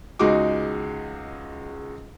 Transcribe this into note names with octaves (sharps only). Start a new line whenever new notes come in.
C#2 G#3 D#4 F#4 D6